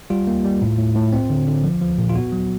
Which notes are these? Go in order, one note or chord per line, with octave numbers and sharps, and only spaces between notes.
G3 F4
A#3
G3
A2
A2
A2
C4
D3
D3
F3
F3
A#2
F4
B3 F#4
F#3